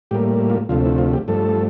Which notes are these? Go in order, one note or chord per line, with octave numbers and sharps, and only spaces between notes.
A2 G3 A#3 G4
F4
D2 C3 F3 A3 F4
E4
F4
G4
G2 F3 A3 A4